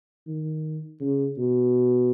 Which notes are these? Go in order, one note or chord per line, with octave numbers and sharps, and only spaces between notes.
D#3
C#3
B2